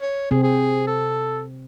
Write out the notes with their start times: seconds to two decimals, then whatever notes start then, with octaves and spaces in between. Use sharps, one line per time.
0.02 C#5
0.31 C3 C4 G#4
0.43 G#4
0.87 A4